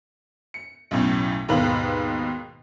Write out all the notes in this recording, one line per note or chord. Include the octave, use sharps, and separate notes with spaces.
C#7
B1 F#2 A2
D#2 G#2 B2 B4 F5 F#7